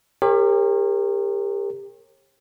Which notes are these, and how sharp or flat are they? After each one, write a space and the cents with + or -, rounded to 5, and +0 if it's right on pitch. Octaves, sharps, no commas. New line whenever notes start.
G4 +30 A#4 -25 C#5 -40